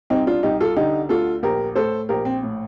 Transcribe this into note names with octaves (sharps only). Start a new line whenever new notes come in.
C2 C4 D#4
D4 F4
C2 D#4 G4
F4 A4
D3 D#4 G4
D2 F4 A4
A#1 G4 A#4
A2 A4 C5
A#1 G4 A#4
C4
A2